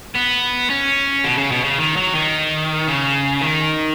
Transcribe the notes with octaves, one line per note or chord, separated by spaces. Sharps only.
B3
C#4
B2
C#3
B2
C#3
D#3
F#3
D#3
C#3
D#3